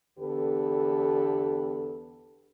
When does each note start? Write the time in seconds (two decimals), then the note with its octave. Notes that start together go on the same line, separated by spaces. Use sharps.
0.19 E2 D3 B3 G4 A4 B4